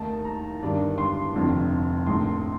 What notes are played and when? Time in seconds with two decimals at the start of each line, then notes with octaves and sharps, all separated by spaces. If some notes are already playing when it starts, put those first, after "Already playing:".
Already playing: D#2 D#3 A3 D#4 A5
0.25 A#5
0.61 G1 G2 D#3 G3 D4
0.98 C6
1.34 F1 F2 D3
2.06 A#1 A2 A3 D#4 C6